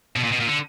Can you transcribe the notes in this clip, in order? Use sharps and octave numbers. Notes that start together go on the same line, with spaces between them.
B2
A#2
B2
A#2
D3